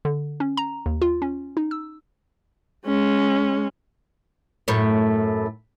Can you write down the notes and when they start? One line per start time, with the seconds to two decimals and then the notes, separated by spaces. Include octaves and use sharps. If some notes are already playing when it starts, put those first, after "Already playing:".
0.05 D3
0.40 C#4
0.57 A#5
0.86 D#2
1.02 F4
1.22 C#4
1.57 D#4
1.71 E6
2.86 G#3 C#4
4.68 F#2 A2 C#5